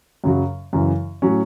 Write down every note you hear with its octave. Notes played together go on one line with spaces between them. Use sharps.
F#2 C#3 F#3
F#2 C#3 E3
A2 F#3 C#4